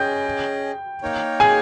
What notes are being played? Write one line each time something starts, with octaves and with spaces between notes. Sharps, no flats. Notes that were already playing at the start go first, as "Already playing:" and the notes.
Already playing: C#4 G#4 D#5 G5 G6
A#3 D#4 A#4 C#5 G5
G#4 G#5